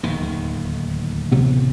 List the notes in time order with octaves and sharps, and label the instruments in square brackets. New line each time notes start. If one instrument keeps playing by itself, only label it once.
[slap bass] D1 D#2 D#3
[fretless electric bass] A1 C3 B3